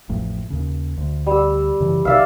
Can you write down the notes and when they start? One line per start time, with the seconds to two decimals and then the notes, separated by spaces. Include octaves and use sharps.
0.09 A1 F2 A2
0.50 D#2 C#3
0.98 D2
1.27 G3 E6
1.80 F#2 C#3 E3
2.05 B1 C3 D#3 D5 E5 F5